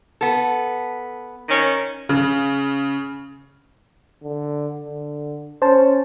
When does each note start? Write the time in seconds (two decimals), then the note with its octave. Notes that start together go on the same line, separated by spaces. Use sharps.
0.21 B3 A4
1.49 D#3 C#4
2.09 C#3
4.23 D3
4.80 D3
5.62 C#4 C5 A5